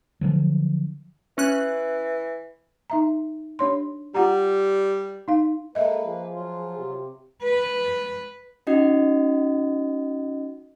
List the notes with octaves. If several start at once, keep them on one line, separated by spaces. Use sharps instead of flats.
D3 F3 F#3
E3 C#4 F#6
D#4 E5 A#5
D4 C#5 C6
G3 F4 F#5 A#5
D#4 F5
G#3 A#3 A4 B4 D#5 E5
F3 G#4
F#3 F4
C3
B4
C#4 D#4 F#4 D#5